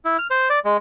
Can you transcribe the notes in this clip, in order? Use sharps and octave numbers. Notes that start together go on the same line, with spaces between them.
E4
F6
C5
D5
G#3